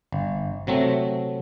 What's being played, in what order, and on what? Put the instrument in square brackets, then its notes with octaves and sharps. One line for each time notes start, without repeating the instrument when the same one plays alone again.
[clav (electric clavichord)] G1
C3 F#3 A3 C4